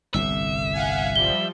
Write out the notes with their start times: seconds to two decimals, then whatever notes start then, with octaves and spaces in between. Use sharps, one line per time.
0.14 G1 C2 A2 E5
0.73 F5 F#5 G#5
1.16 F3 G3 G7